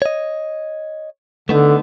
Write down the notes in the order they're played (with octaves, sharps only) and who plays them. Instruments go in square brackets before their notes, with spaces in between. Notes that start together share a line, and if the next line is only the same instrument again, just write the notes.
[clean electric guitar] C#5 D#5
[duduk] D3 [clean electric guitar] A3 B3 D#4